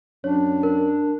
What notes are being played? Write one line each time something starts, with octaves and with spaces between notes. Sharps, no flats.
F#2 D4 C#5
A#4